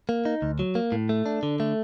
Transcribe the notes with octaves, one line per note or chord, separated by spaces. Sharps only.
A#3
D#4
D2
F#3
A#3
A2
A3
D4
D3
A3